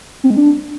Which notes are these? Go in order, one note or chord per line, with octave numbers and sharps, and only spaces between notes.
C4
G#3
D4